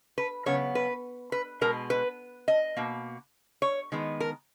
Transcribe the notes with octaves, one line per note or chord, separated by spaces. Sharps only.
B4
C#3 F#3 B3 C#5
B4
B4
B2 G#3 B3 A#4
B4
D#5
B2 A#3
C#5
D#3 G#3 B3
A#4